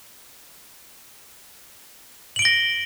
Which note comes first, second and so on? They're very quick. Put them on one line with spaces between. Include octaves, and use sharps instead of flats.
F#7 D7 G7 A#6